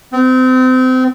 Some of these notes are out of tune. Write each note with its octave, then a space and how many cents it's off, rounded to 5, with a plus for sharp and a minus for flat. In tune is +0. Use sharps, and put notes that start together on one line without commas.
C4 -30